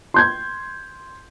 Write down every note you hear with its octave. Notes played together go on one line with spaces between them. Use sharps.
C6 G6 G#6